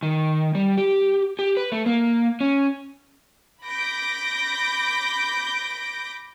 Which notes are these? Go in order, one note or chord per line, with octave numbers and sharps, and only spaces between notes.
D#3
G3
G4
G4
B4
A3
A#3
C#4
B5 D6 G6 A#6 D7